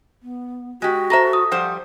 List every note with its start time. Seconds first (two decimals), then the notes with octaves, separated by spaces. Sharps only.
0.23 B3
0.82 G#3 F#4 G4
1.10 A4 C5 E5 A#5 A#6
1.33 D#6
1.51 F3 G3 C5 F#5